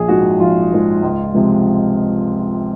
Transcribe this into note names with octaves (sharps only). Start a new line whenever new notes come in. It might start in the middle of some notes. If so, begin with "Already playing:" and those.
Already playing: A#1 G#4
G#2 F3 G#3 F#4
A#1 F4
G#2 F3 G#3
C#2
C3 F3 G#3